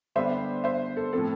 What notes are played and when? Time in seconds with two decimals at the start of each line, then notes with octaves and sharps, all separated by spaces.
0.16 D3 G3 B3 D4 C5 E5
0.64 C5 E5
0.97 A4
1.13 A2 F3 C4 A4